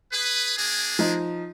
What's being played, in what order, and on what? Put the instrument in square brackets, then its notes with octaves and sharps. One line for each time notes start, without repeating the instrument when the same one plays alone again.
[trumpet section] G#4 B4
A#3 D4 G#4
[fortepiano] F3 D#4